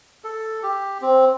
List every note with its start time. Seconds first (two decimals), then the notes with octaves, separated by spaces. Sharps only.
0.24 A4
0.63 G4
1.02 C4